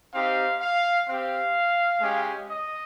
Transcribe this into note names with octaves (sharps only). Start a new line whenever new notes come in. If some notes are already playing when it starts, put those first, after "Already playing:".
C4 D#4 G4 F5
F5
C4 G4 F5
G#3 C#4 G4
D#5